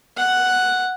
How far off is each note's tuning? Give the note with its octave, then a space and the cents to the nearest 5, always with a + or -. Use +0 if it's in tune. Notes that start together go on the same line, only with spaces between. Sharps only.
F#5 +0